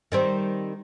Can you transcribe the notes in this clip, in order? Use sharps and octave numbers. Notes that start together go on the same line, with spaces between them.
D#3 G3 C4